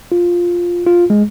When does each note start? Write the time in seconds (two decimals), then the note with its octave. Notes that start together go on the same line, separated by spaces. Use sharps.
0.12 F4
0.87 F4
1.10 G#3